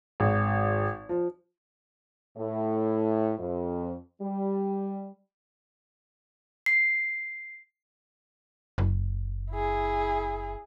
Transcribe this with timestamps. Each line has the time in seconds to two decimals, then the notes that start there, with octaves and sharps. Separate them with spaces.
0.20 G#1
1.09 F3
2.38 A2
3.40 F2
4.22 G3
6.66 C7
8.78 F#1
9.51 E4 G#4